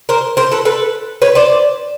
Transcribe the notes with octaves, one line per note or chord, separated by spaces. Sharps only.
A#4 C5
A#4 C5
A4 B4
A4 B4
B4 C#5
C5 D5